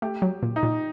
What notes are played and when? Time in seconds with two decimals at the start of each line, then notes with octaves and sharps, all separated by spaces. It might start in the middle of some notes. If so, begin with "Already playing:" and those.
0.02 A3 G4
0.22 F#3
0.43 A#2
0.56 D#4
0.63 A#2